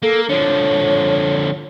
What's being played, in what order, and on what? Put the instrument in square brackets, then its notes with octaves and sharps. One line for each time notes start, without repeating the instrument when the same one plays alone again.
[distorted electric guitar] A#3 [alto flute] A4
[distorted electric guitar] D3 F3 [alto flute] C#5